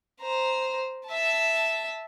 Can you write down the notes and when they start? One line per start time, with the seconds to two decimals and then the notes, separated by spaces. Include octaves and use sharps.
0.21 C5 A#5
1.07 E5 A5